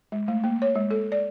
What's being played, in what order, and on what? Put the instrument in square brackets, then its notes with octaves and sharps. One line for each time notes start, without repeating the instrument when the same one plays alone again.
[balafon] G#3
A3
A#3
C#5
G#3
A4
D5